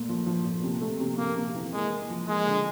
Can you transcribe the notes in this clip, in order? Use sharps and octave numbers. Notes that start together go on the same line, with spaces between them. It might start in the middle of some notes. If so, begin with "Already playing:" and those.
Already playing: A#2 A3
F3
F3
A#2
C3
A3
C3
C3 A#3
C3
E3
G#3 A#3
A#3
F3
G#3 A#3
D3